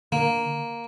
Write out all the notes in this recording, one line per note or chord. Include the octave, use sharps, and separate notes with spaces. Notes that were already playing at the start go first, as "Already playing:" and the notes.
D3 A#3